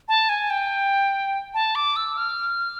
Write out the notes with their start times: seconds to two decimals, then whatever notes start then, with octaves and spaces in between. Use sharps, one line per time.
0.08 A5
0.29 G#5
0.50 G5
1.54 A5
1.75 D6
1.96 E6
2.17 F6